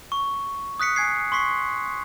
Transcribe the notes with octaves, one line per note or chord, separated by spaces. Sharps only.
C#6
D#6 F#6 B6 C#7
G#5 G#6 C7
C6 C#6 B6 C7